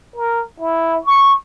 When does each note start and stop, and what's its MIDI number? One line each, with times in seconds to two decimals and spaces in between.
0.16 0.43 70
0.60 0.99 64
1.04 1.33 85